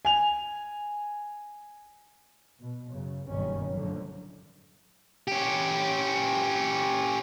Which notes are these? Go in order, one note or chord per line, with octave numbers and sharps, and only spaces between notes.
G#5 F7
B2
F#2 C#3
F#1 B1 G2 D#3 G3 C#4
F#2 A2 D3 F3 F#3
C#4 G4